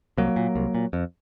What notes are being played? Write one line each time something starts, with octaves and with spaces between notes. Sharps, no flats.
C2 F#3 A#3
A#2
C2
A#2
F2